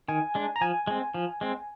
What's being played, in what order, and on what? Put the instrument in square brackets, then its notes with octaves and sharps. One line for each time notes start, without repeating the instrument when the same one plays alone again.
[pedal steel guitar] D#3 [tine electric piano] G#5
[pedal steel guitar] G#3 D4
[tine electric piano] A#5
[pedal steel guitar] F3 [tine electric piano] G#5
[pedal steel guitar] G#3 C4
F3
G#3 C4